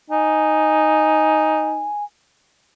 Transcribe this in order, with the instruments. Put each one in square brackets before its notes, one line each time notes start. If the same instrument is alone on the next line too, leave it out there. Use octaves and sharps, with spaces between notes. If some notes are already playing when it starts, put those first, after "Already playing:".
[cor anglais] D#4 [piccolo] G#5